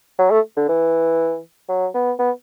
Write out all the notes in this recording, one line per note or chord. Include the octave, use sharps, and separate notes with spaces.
F#3
A3
D3
E3
F#3
B3
B3